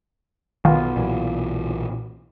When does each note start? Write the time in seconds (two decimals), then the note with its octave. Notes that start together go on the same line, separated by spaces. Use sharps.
0.65 B1 D#3 B3 F4
0.96 B1 A#2 E3 F#3